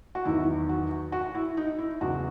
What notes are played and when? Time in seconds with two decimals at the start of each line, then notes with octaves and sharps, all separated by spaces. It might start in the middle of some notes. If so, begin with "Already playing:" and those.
0.15 F#4
0.25 E2 D#3 F#3 E4
0.69 F#4
1.12 F#4
1.35 E4
1.57 D#4
1.78 E4
2.01 E2 C#3 F#3 F#4